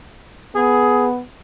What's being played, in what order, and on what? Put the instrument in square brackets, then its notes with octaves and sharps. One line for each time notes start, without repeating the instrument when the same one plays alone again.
[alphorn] B3 [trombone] G#4